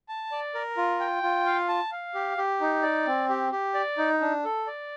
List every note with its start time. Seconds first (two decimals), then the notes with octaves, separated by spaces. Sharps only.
0.09 A5
0.31 D5
0.55 A#4
0.77 F4
1.00 G5
1.23 F4
1.46 F5
1.69 A5
1.92 F5
2.15 G4
2.37 G4
2.61 D#4
2.83 D5
3.07 C4
3.29 G4
3.52 G4
3.74 D5
3.98 D#4
4.21 D4
4.44 A4
4.67 D5